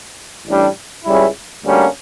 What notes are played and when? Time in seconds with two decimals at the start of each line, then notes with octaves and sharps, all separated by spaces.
0.47 A1 A2 G3 D4
1.05 C#2 C#3 G3 C#4 E4
1.65 D2 D3 G3 A#3 C#4